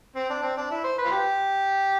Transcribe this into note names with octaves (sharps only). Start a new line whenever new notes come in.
C4
D4
C4
D4
E4
C5
B4
F4
G4